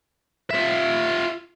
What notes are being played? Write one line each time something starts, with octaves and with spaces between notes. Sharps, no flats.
F4 E5